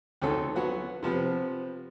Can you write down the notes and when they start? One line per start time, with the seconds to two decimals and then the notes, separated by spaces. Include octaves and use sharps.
0.22 D2 D#3 C#4 A4
0.55 F#3 B3 F#4
1.03 C3 F3 B3